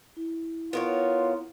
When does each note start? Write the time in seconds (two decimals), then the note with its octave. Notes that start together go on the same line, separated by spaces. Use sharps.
0.17 E4
0.73 B3 F4 A#4 C#5